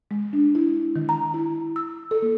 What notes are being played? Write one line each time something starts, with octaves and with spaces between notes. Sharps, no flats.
G#3
D4
E4
D#3
A#5
E4
E6
A4
A#3